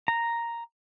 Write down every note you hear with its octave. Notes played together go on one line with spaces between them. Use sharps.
A#5